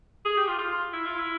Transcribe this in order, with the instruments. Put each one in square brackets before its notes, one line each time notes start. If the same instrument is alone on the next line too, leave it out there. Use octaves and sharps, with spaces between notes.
[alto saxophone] G#4
G4
F4
F4
E4
F4
E4